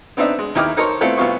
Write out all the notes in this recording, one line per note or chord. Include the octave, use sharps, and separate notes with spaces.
B3 C4 D4 D#4 E5
G#3
D#2 D#4 E4 G5 D6 F6
D#4 A4 A#4 C5 C#5
A3 B3 C4 E4 F4 A4
C2 B3 F4 C#6